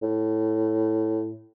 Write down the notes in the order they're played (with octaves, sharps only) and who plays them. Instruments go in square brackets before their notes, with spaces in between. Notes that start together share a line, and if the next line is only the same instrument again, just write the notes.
[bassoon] A2